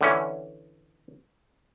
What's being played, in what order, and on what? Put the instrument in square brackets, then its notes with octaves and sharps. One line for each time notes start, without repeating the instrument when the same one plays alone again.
[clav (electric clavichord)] D3 E3 C#4